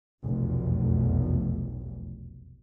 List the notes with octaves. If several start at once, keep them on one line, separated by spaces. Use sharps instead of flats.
F1 B1 E2